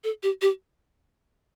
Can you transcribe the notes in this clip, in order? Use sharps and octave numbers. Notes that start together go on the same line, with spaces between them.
A4
G4
G4